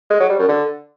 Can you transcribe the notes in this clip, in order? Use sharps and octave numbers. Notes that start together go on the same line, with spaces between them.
G#3
F#3
G3
F#2
D3